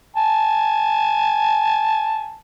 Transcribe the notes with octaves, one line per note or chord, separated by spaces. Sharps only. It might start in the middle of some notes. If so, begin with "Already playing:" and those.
G#5 A5